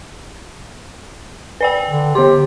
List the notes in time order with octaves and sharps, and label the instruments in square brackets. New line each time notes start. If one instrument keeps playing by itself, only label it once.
[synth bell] B4 D5 G5
[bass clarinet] D3
[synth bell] D3 C6 [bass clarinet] G4